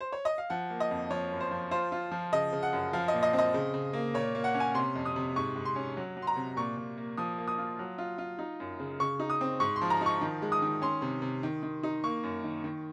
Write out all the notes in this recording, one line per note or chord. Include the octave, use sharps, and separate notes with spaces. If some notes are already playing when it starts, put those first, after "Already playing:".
C5
C#5
D#5
F5
F3 F#5
A#3
D#5
F2
F3 C#5
F#2
C5
F3
F4 C5
F4
F3
C#3 D#5
C#3
F#5
F#2
F3 F5
D#5
A#2
D#5
C4
D#5
C#3
C#3
A#3
A#2 C#5
A#3
F#5
C#4
G#5
C3 C6
F2
D#6
C3
G#2 C#6
G#2
C6
C#4
F#3
F#3
C6
A#5
C3
A#2 C#6
A#2
A#3
F3 D#6
A#3
D#6
F4
F#3
F4
F4
D#4
F#2
C#3
C#3 C#6
D#4
D#6
C4
G#2 C#6
C6
F3
A#5
D#4
C#6
D#3
G#3
D#6
D#3
C#4 C6
C3
C3
D#3
D#3
D#4
A#3 C#6
F#2
D#3
D#3